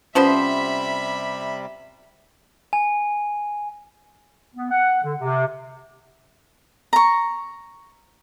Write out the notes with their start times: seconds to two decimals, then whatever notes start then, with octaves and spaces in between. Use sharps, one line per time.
0.15 C3 F3 G3 B3 C#4 C5 E5 B5
2.73 G#5
4.55 B3
4.70 F#5
5.02 D3
5.19 C3
6.93 A#5 C#6